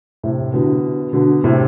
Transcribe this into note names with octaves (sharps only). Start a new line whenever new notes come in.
A2 C3
B2 D3
B2 D3
A2 C3